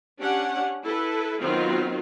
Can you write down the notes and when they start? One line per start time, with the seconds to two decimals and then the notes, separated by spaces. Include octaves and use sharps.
0.19 C#4 D4 G4 F#5
0.84 E4 A4 B4
1.40 D#3 F#3 B3 C4 F4